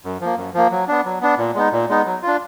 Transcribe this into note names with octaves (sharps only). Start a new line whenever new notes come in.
F#2
F3 A#3
F#2
F3 A#3
F#3
B3 D4
F#3
B3 D4
A#2
G#3 B3 D#4
A#2
G#3 B3 D#4
F#3
D4 F4